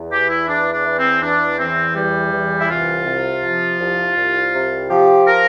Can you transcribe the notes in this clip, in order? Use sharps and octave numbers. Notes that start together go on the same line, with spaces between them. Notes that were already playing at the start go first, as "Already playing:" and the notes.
Already playing: E2
E3 G4
E4
E2 D4
D4
E3
C4
E2 D4
E3 C4
E2 G3
E3
E4
C2 F4
C3
F3
C2
C2
C3
F3 G4
A#4